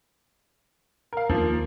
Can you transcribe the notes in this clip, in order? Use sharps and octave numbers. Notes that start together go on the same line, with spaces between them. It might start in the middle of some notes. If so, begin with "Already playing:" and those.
A#4 F5
D#2 F3 A#3